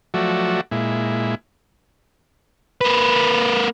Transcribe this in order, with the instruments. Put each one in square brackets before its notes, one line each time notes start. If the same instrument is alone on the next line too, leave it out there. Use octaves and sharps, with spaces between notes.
[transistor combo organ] F3 F#3 A3 F#4 D5 E5
A#2 G#3 E4
[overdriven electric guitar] A#3 B4